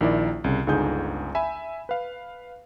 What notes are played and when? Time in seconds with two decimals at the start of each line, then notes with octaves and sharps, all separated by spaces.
0.01 A#1 D#3 E4 D5
0.44 C2 C#3
0.66 G1 C#2 D3 D#4 G#4 G6
1.35 E5 G#5 B5
1.89 B4 F5